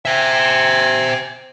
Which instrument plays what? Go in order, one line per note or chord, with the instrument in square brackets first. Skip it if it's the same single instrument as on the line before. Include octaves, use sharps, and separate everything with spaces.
[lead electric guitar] C5 E5 [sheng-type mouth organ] G5 G#5